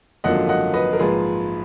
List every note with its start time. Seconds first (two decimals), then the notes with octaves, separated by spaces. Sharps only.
0.24 G#1 F#2 D3 F3 A#3 D#5 F#5
0.49 D#5 F#5
0.74 B4 D#5
0.93 A#4
0.99 A#1 G#2 F3 G#4 B4